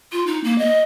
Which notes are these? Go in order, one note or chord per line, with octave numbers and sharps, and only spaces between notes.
F4
D#4
A#3
D#5